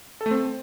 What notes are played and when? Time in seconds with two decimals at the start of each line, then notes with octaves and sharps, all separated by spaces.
0.21 A4
0.26 A3
0.31 C4